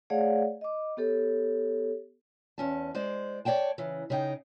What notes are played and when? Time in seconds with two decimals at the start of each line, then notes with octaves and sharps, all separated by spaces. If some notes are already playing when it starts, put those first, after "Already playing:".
0.10 A3 G#4 C#5 D5 F5 F#5
0.61 D#5 D6
0.97 B3 G4 A4 C#5
2.58 E2 C#4 A5
2.95 G#3 C5 D5
3.45 C#5 D5 F5 G5 A5
3.78 C#3 E3
4.10 C#3 D#4 G5